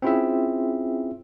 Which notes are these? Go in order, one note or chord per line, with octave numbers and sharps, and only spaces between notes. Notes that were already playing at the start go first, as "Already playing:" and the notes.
C4 C#4 E4 F4 G#4 E5